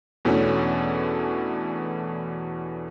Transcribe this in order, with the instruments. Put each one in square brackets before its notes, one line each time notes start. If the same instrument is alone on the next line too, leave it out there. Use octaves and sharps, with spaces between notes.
[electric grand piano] E2 B2 E3 A3 C#4 D4